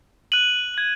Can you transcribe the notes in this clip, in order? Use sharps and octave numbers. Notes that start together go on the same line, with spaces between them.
F#6 D#7 F#7
G#6 F#7